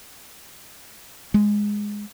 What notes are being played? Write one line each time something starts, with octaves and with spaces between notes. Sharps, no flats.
G#3